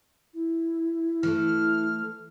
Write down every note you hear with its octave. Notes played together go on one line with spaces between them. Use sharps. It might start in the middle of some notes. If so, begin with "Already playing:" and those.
E4
E3 A3 A4 F6